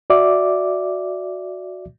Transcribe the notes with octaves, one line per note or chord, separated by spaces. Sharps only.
F#4 D5 E5 D6